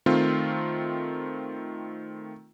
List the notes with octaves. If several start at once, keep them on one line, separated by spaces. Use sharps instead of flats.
D#3 A3 C4 F4